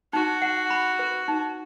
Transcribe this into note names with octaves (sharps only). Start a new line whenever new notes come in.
D#4 F#4
F#5
B5
B4
D#4